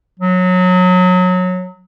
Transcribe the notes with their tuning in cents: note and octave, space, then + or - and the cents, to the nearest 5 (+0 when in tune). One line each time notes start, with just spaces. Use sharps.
F#3 -20